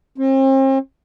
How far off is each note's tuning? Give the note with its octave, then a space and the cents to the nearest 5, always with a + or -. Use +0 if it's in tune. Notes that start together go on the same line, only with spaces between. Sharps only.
C4 +40